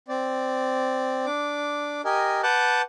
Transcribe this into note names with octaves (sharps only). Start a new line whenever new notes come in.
C4 D5
D4 D6
G4 A#4 D#5 G#5
B4 F#5 A5 D6 F#6 G6